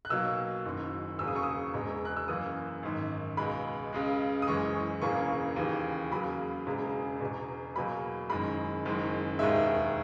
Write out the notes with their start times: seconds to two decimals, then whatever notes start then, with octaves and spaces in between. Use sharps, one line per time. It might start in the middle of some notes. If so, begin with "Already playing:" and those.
0.05 F#6
0.09 B1 B2 F#3 A#3 E6
0.65 F#1 F#2 D#3
1.19 E1 E2 C#3 F#3 A#3 E6
1.28 D#6
1.36 C#6
1.43 D#6
1.74 E1 E2 B2 G#3
2.05 F#6
2.17 E6
2.28 F#2 E3 A#3 D#6
2.83 G#1 F#2 D#3
3.37 C#2 B2 G#3 B5
3.93 C#2 C#3 G#3
4.42 D#6
4.47 F#1 F#2 E3 G#3 C#6
5.02 E1 E2 C#3 E3 A#3 C#6
5.56 D#2 C#3 E3
6.11 E2 C#3 F#3 A#3 B5
6.66 E1 E2 C#3 G#3
7.21 E1 E2 B2
7.76 E2 B2 F#3 A#3 B5
8.30 F#1 F#2 D#3 G#3 B5
8.85 F#1 F#2 D#3 G#3
9.39 E1 D#2 D#3 G#3 E5